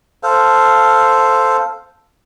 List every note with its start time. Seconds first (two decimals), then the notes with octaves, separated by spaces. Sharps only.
0.23 A4 C5 F5